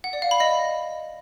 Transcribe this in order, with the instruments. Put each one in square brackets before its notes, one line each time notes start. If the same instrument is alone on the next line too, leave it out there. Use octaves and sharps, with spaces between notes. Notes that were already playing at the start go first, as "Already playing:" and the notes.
[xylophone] F#5
D5
F5
B5
D#5